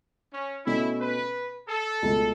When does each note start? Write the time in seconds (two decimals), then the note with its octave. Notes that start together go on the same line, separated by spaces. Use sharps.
0.33 C#4
0.66 B2 A3 C#4 E4
1.00 B4
1.69 A4
2.02 C#2 B2 A3